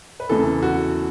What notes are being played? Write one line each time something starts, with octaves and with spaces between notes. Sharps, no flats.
B4
E2 C#3 E3 A4
F#4